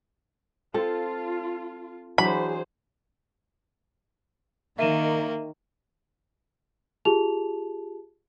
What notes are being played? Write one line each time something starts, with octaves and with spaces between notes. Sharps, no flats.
C4 F4 A4
E3 F#3 D4 G#4 C5 B5
D#3 A#3 E5 D#7 E7
F4 G4 G#4 A5 F7